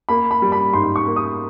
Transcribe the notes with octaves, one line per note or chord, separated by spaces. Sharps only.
A#3 B5
B5
G3
B5
G#2 C6
C#6
A#3
D#6